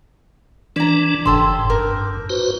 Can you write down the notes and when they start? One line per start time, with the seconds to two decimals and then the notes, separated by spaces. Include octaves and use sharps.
0.76 E3 D4 D5 A#5
1.25 F#1 G#2 G4 A4 C6
1.70 G2 A#4
2.30 F#4 B4 C5